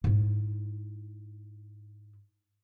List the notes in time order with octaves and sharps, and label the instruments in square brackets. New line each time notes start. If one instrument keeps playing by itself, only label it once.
[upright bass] G#2 E4